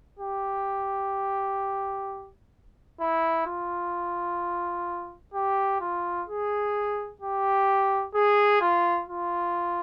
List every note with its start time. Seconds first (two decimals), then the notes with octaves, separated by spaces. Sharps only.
0.19 G4
3.00 E4
3.47 F4
5.34 G4
5.80 F4
6.28 G#4
7.21 G4
8.15 G#4
8.61 F4
9.09 F4